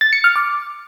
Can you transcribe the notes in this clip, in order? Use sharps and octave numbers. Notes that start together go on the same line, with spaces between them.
A6
C#7
F6
D6